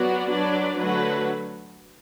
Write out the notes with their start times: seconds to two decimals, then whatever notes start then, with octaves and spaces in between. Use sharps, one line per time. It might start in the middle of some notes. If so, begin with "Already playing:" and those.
Already playing: F#3 B3 F#4 D5
0.30 F#3 D4 B4 D5
0.77 D3 F#3 A3 F#4 B4